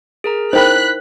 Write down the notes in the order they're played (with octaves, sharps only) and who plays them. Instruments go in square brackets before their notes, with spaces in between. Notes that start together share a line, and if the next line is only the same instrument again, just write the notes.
[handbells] G#4 A#4 A#5
[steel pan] D#4 A#4 [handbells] E4 [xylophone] C5 G5 B5 [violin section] F#6 B6